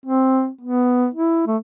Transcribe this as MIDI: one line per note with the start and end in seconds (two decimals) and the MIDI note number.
0.06 0.49 60
0.61 1.08 59
1.14 1.46 64
1.47 1.57 57